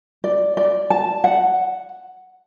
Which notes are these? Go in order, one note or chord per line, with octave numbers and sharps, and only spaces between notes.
D5
D5
A5
F#5